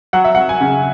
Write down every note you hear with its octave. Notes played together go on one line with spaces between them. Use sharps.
F#3 F#5
E5
F#3 F#5
G#5
C#3